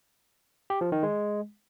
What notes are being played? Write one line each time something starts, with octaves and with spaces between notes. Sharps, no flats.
G4
F3
D#3
G#3